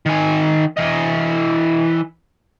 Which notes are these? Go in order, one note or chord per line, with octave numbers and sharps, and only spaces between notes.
D#3 G#5
E3 D#5